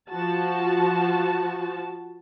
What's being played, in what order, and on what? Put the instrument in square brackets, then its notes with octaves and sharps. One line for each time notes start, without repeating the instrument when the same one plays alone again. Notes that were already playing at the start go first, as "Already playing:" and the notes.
[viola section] F3 F#4 A5